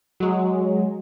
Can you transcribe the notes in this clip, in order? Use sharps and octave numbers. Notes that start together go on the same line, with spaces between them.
F#3 G#3